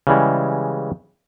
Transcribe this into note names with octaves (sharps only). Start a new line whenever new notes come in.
C#3 E3 G3 G#3